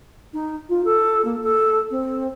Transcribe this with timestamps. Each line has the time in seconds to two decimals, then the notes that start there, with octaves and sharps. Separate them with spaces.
0.34 D#4
0.69 F4
0.85 A4
1.25 A#3
1.43 A4
1.91 C4